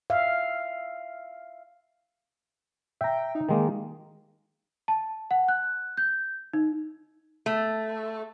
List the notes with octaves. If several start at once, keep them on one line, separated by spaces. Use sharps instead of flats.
E5 F5
E5 G5 A#5
D#4
D#3 G#3 A#3
A5
F#5
F#6
G6
D#4
A3